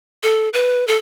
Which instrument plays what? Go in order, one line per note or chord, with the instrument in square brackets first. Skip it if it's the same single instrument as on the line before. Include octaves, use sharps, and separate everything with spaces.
[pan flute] A4
B4
A4